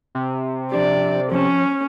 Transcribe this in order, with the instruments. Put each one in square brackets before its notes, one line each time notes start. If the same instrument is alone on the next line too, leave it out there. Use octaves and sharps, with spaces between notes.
[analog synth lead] C3
[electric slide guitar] F3 D4 G4 [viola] D5
[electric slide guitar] F3 A5 [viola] C#4